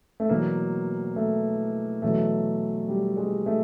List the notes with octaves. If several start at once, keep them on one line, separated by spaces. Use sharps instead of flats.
A3
E2 B2 F#3 A#3
A3
E2 B2 F#3 A3
G3
G#3
A3